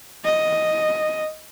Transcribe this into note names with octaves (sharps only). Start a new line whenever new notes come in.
D#5